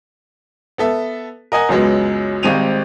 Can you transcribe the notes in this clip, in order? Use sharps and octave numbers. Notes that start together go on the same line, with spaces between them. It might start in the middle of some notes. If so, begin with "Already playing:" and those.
B3 A4 E5
A#4 D#5 F#5 G#5
C#2 F#2 F#3 G#3 B3
G#1 G3 G#3 C4 D#7 F7